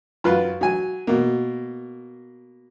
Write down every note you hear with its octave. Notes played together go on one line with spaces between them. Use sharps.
F#2 F4 B4
F#3 G#5
B2 A#3